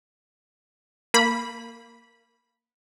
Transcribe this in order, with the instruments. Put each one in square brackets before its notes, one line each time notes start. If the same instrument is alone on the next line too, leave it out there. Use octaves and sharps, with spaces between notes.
[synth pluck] A#3 B5